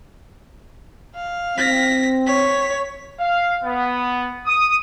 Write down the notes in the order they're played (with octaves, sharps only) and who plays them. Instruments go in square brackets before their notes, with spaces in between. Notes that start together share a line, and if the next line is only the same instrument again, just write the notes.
[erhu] F5
[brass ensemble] C4 [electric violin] A#6 B6
[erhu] C#5 [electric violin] B6
[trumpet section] F5
B3
D#6